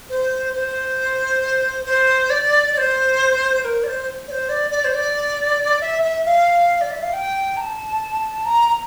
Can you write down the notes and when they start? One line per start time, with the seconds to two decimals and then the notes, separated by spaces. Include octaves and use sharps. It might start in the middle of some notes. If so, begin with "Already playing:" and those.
0.10 C5
0.54 C5
1.85 C5
2.30 D5
2.73 D5
2.78 C5
3.61 C5
3.65 A#4
3.83 D5
3.88 C5
4.28 D5
4.31 C5
4.49 D5
4.71 D5
4.85 C5
4.93 D5
5.81 E5
6.02 E5
6.25 F5
6.81 D5
6.91 E5
7.02 F5
7.13 G5
7.57 A#5
7.62 A5
8.45 A#5
8.67 A#5